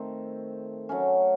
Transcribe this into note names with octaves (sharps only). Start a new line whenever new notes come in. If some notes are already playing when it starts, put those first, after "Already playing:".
Already playing: D#3 A3 C4
F#3 A3 C#4